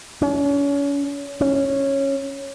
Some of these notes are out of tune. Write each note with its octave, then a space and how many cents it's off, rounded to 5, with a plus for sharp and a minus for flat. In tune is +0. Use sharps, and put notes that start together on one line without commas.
C#4 +35
C#4 -10